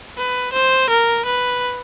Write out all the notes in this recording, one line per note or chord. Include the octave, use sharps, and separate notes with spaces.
B4
C5
A#4
B4